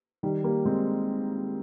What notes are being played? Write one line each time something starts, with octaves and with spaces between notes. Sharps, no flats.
D#3 G3
G3 A#3
G#3 C4